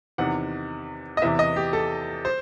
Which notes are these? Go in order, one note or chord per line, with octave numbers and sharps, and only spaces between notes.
E2 C3 D#3 F#5
D#5
E2 C3 E3 E5
D#5
G4
A4
C5